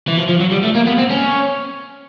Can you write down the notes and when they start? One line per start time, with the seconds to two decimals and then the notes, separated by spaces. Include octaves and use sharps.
0.07 E3
0.17 F3
0.29 F3
0.41 F#3
0.52 G3
0.64 A3
0.76 A#3
0.87 B3
0.98 C4
1.10 C#4